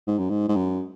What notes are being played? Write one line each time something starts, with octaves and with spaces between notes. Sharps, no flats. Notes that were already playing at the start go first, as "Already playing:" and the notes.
G#2
F#2
G#2
G#2
F#2